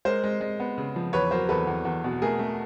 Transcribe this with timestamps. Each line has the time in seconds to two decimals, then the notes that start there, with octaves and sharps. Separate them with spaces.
0.05 G#3 A#4 C5
0.24 G#3
0.41 G#3
0.60 B3
0.78 C#3
0.96 F3
1.13 E2 B4 C#5
1.31 F#3 A#4 C5
1.49 E2 A4 B4
1.67 E2
1.85 E2
2.04 B2
2.22 A3 G#4 A#4
2.39 A3